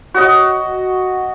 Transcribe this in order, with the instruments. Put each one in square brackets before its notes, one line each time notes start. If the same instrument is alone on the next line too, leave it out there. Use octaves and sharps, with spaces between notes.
[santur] F#4 D#5